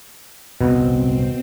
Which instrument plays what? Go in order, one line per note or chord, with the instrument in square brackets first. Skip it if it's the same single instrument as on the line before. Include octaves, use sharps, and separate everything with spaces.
[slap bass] D#1 C2 F#2 [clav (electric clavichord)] B2 [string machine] C4